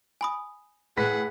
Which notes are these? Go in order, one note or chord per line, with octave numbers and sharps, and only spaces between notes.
G#5 B5 D#6
A2 G#4 B4 F#5 B6